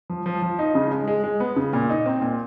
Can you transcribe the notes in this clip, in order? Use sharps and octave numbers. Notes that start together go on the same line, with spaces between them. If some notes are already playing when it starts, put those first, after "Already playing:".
F3
F3
F3
D#4
C#3
G#3
G#3
G#3
B3
C#3
A#2
D#4
C4
A#2